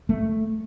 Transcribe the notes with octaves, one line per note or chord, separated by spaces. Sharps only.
A3